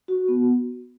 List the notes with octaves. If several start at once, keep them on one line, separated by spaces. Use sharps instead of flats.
F#4
B3